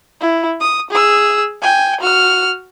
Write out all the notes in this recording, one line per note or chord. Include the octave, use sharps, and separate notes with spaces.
E4
D#6
G#4 E6
G5 G#5
F#4 F6